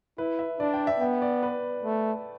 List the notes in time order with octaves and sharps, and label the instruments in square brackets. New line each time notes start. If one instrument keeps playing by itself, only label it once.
[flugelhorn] E4 [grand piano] B4
[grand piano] E5
[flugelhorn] D4 [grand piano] D5
[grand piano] G5
E5
[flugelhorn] B3 [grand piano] G5
[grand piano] D5
B4
[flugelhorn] A3